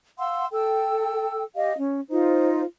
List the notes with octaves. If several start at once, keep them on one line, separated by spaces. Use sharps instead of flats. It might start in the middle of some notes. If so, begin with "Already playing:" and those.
F5 F#5 C6 E6
A4 G5 E6
G4 D#5 F5
C#4
D#4 F4 C5